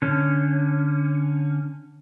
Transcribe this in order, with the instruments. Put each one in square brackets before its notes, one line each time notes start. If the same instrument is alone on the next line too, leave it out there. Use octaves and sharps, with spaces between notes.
[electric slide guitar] D3 C#4